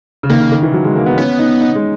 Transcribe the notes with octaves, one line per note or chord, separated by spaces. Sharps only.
C#3
D#3 A#3
C#3
D#3
E3
F#3
G#3
A#3
B3
B3 C#4
D#4
D#4
G#3